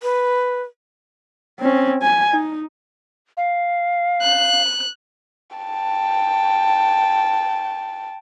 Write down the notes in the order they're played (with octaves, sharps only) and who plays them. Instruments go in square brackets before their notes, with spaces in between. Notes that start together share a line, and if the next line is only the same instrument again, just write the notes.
[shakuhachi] B4
[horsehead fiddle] C4 C#4
G#5
D#4
[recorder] F5
[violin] F#6
[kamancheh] G5 A5